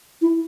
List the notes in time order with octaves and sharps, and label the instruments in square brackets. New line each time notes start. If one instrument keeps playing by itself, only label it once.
[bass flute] E4